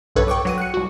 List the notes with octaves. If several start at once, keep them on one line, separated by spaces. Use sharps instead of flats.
B1 G2 A4 B4 C#5
G5 C#6 D6
F#3 F#5 D#7
F#6 C#7
C2 F#4